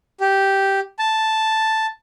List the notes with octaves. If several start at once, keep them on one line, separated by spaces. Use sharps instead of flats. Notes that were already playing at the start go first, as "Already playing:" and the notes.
G4
A5